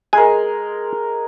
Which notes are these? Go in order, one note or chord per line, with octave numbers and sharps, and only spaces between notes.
G#3 G#4 A#4 G#5